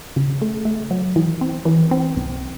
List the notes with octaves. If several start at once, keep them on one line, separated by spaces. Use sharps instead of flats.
C#3
A3
A3
F#3
E3
C4
E3
C4
C2